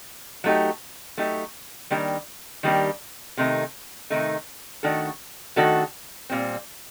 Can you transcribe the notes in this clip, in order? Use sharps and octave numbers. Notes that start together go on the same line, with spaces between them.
F#3 A3 D#4 G4
F#3 A3 D#4 G4
D#3 G3 A#3 D4 G4
D#3 G3 A#3 D4 G4
C3 D#3 A3 D#4
C3 D#3 A3 D#4
D#3 A3 D4 F#4 A4
D#3 A3 D4 F#4 A4
A#2 G3 C4